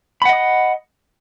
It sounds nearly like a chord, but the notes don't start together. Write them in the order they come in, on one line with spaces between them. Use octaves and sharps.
B5 F#5 D#5 D#6